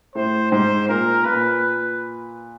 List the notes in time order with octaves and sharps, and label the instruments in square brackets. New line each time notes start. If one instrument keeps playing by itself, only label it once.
[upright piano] A2 [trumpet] C5
[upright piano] G#2 [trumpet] C5
[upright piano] A#2 [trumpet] A#4
[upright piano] A#2 [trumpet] B4